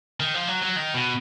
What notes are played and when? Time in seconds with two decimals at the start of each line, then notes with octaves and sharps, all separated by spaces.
0.20 D#3
0.34 F3
0.48 F#3
0.62 F#3
0.76 D#3
0.94 B2